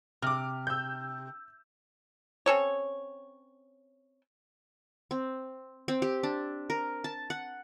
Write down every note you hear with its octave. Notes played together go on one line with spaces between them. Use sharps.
C3 D6 F6
E6 G6
C4 C#4 A4 C#5
C4
C4
G4
D4
A#4
A5
F#5